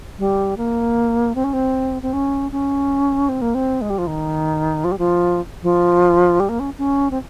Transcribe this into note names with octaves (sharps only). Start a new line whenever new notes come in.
G3
A#3
C4
C#4
C4
C4
C#4
C#4
C4
A#3
C4
G#3
G3
F3
D#3
F3
G3
F3
F3
G3
A#3
C#4
C#4
C4